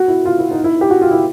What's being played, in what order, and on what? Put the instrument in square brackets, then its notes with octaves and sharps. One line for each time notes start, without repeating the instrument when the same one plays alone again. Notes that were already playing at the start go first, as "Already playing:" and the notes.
Already playing: [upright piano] F#4
E4
F4
E4
D#4
E4
G4
F#4
F4
E4